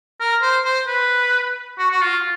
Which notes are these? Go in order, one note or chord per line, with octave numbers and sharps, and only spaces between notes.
A#4
C5
C5
B4
F#4
F#4
F4